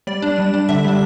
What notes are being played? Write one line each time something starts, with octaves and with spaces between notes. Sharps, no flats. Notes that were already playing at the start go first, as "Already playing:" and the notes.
G3 D5
D4
G3
D4
D3 E5
G3 D4